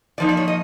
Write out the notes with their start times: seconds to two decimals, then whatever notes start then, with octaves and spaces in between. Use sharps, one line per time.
0.18 A#2 F3 A#3 D#4 D5
0.29 D5
0.37 C#5
0.48 D#5